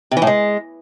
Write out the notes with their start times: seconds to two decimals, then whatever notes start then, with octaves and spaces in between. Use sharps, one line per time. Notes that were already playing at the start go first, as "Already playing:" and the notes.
0.11 C3
0.17 E3
0.22 A2
0.27 G#3